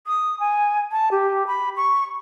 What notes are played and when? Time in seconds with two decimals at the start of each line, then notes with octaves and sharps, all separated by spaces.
0.07 D#6
0.40 G#5
0.92 A5
1.11 G4
1.47 B5
1.77 C#6